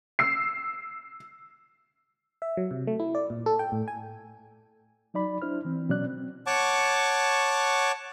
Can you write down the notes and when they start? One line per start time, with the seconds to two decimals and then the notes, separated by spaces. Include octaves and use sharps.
0.19 E6 C7
2.42 E5
2.57 F#3
2.71 C3
2.87 A3
3.00 E4
3.15 D5
3.30 A#2
3.46 A4
3.59 G5
3.72 A2
3.88 G#5
5.14 F#3 D#4 D5 B5
5.42 D4 E4 C5 F6
5.65 E3 C4
5.89 B2 F#3 C#4 D5 F#6
6.05 C4
6.47 C#5 F#5 A5 C#6 D6